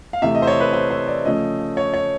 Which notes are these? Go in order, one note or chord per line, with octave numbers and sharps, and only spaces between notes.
F5
C3 E3 A3 E5
D#5
C5
C#5
B4
C5
C5
D5
C#3 F3 A3 D#5
C#5
C#5